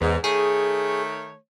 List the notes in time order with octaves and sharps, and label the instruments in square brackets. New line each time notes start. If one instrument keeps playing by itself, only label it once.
[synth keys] E2 [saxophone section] G#2
[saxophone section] D#3 A3 C#5 [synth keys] G#4